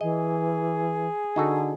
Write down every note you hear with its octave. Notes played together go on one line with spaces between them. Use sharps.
E3 G#4 D#5
D3 D#4 F#4 A4